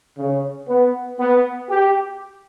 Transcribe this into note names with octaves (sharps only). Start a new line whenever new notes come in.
C#3
B3
B3
G4